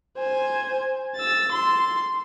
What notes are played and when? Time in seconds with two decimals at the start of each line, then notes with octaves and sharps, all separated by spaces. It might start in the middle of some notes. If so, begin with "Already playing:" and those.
0.17 C5 G#5
1.16 E6 A6
1.52 C6